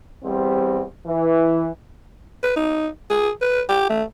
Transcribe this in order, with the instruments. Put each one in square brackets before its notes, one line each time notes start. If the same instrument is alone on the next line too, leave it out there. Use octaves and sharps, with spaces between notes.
[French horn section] E2 G3 C4
E3
[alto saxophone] B4
D#4
G#4
B4
G4
A3